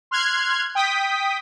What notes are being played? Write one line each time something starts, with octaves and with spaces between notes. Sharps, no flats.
C6 F6 F#6 G#6
G5 D#6 B6